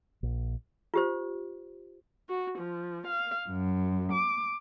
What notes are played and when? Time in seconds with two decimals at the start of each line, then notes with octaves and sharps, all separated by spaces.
0.23 A#1
0.94 F4 G4 C5
2.28 F#4
2.57 F3
3.06 F5
3.48 F#2
4.12 D6